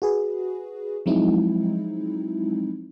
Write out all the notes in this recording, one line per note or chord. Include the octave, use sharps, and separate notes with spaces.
F#4 G#4 B4
F3 F#3 G#3 C4 D#4 E4